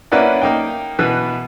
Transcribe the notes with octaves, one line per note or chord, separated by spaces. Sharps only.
A#3 C#4 E4 B4 D5 F#5
A#3 D#4 G5
B2 E3 B4